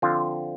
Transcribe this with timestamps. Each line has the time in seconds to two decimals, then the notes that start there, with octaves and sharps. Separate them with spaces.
0.02 D3 F3 C4 F4